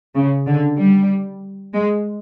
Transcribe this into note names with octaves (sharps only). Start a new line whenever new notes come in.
C#3
D3
G3
G#3